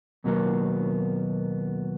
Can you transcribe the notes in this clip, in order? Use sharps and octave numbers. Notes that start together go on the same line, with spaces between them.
D#2 B2 F#3 G3 A#3 B3